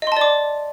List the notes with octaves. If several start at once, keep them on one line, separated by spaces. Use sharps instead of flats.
D5 D#5 A5 C6 D6